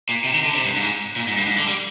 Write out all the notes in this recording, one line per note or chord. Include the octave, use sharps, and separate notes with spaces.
A#2
C3
D#3
D3
C3
G2
G#2
A#2
G#2
G2
G#2
D3
G3